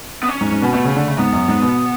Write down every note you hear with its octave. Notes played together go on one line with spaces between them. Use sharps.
B3
C#4
G#2
G#2
B2
B2 A3
C#3
D3
C#3
G#2 B3
F#2
G#2
B2